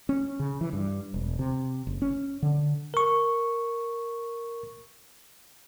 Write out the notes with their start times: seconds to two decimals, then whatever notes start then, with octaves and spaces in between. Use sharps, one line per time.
0.09 C#4
0.40 C#3
0.61 E3
0.73 G2
1.14 E1
1.39 C3
1.87 F#1
2.02 C#4
2.42 D3
2.94 A#4 C#6